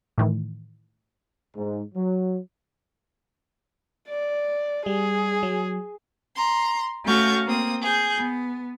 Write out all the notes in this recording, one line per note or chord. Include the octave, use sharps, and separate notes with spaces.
A2 D#3 E3
G#2
F#3
D5
G3 G#4
F#3
A#5 C6
A3 C#4 F#4 F5 C#6 G6
A#3 C4 D#6
G#4 G6
B3